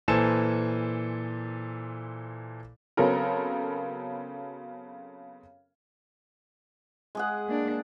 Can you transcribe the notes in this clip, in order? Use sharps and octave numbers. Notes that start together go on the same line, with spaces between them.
A#2 E3 A4 C5 G#5 E7
C#3 F#3 B3 C4 A4 A#4
G#3 G#4 F#5
A#3 D4